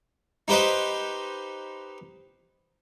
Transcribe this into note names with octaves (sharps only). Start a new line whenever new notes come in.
D#4 G4 B4 C5 D#5